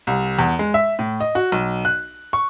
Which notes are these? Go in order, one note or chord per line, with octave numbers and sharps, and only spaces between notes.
C2
E2
G#3
E5
A2
D#5
F#4
B1
F#6
C#6